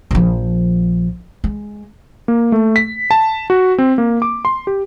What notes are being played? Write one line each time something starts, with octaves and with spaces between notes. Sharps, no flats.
A#1 F3
G#3
A#3
A3
B6
A5
F#4
C4
A#3
D6
C6
G4